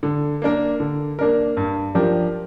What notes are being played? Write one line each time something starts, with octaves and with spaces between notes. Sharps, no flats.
D3
A#3 D4 A#4
D3
A#3 D4 A#4
G2
F3 D4 G4 A#4